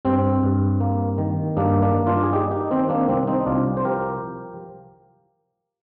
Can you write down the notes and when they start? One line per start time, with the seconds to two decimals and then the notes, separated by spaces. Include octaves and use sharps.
0.05 G2 C4
0.43 G2
0.80 A#3
1.18 D#3
1.57 G2 A#3 D4
1.82 A#3 D4
1.95 G2
2.07 D4 F4
2.23 G#4
2.32 A#3 D#4 G4
2.51 D#4 G4
2.71 D#3 C4
2.89 A#3 D4
3.08 C2 C4
3.27 C4 D#4
3.46 C2 D4 F4
3.77 C5
3.84 F3 G4 A#4